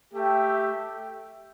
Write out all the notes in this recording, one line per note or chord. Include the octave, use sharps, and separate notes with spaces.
A3 G4 E5 G5